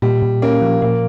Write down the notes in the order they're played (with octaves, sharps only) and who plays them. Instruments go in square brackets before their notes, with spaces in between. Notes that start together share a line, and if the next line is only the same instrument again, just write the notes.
[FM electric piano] A#2 [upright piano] G3
[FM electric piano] A#2
[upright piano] A#3 [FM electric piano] C#4
[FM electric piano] F3
[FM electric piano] A#2 [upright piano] A#3